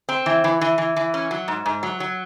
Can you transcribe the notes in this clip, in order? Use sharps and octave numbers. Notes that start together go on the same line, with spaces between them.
C4
E3
E3
E3
E3
E3
C#4
F#3
G#2
G#2
F#3
F#3